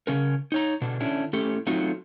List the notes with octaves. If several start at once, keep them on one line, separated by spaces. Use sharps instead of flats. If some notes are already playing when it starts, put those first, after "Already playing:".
C#3 C#4 A#4
D#4 C#5 A#5
B2 D3 D4
D3 C#4 D4 E4
A3 C#4 E4 G4 A4
F#3 A3 C4 D#4 F4 F#4